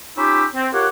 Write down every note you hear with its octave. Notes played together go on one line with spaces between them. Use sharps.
C#4 D#4 F4 G4 B5 E6
C4
F4 G4 A#4 C#5 F#5